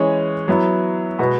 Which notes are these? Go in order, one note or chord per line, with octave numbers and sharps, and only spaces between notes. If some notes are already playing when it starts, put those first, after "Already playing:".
Already playing: E3 G#3 C#4 G#4 C#5
F#3 B3 E4
B2 G#3 B3 F#4 B4